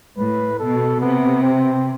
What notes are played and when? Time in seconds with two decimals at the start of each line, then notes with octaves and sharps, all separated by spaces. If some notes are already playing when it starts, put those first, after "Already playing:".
0.17 A2 B4
0.60 B2 A4
1.01 C3 B3
1.43 C4